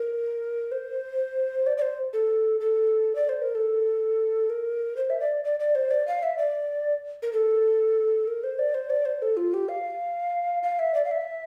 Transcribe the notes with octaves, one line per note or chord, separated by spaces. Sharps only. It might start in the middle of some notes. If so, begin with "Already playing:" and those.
Already playing: A#4
C5
D5
D5
C5
A4
A4
D5
C5
A#4
A4
A#4
C5
E5
D5
D5
D5
C5
D5
F5
E5
D5
A#4
A4
A#4
C5
D5
C5
D5
C5
A4
F4
G4
F5
F5
E5
D5
F5
E5